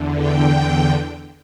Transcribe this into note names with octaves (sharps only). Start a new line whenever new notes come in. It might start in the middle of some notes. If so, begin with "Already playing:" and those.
Already playing: E2 D3
G5